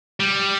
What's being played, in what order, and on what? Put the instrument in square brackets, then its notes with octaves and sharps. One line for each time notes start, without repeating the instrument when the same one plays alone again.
[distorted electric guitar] G3